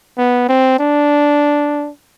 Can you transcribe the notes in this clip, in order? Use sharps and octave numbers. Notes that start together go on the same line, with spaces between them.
B3
C4
D4